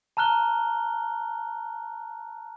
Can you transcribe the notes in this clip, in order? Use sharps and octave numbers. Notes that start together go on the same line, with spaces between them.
A5 A#5 F6 F#6 G7